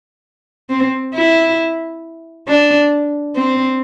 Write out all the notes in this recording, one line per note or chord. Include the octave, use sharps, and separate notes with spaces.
C4
E4
D4
C4